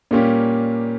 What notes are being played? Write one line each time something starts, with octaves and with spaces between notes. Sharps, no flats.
A#2 G3 A#3 C#4 G4